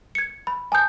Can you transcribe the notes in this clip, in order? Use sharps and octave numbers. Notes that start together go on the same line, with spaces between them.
G#6 C#7
B5
G#5 A5 D#6 G6